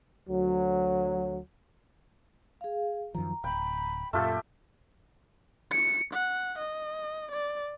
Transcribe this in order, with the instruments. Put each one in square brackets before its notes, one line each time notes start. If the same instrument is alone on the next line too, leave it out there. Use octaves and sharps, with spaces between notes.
[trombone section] D2 F#3
[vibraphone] G#4 F5
[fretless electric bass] F#2 D#3 F3 [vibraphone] A#5
[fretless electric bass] D1 [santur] G5 [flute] B5
[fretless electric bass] F#2 A#2 [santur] A3 F4 G4 [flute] A4
[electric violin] C#7
F#5
D#5
D5